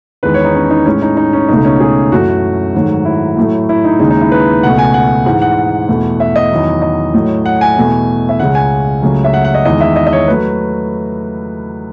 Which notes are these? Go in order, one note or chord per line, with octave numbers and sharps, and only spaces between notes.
E2 D#3 G#3 B4
C#5
D#4
C#4
D#4
A2 G#3 C#4
D#4
D#4
C#4
C#2 B2 A3 D#4
C#4
G#4
F#2 E3 A3 F#4
G#2 D#3 F#3 A3
E4
A2 F#3 A3
E4
D#4
D#2 C#3 G#3 D#4
D#4
E4
B4
C#2 B2 A3 F#5
G#5
F#5
G#2 E3 G#3 F#5
F#5
E2 B2 A3
E5
D#5
E2 D#3 F#3
D#5
A2 F#3 A3
F#5
G#5
E2 B2 A3
E5
C#2 C#3 G#3 F#5
G#5
C#2 C#3 F#3 A3
E5
F#5
F#5
D#5
E2 D#3 G#3 D#5
E5
D#5
D#5
C#5
F#3 A3 B4